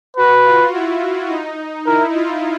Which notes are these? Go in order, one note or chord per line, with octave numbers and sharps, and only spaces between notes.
F#4 B4
F4
E4
D#4
E4 A#4
F4